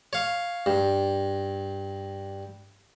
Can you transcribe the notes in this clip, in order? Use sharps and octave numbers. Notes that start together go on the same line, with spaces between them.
C#5 F5
G2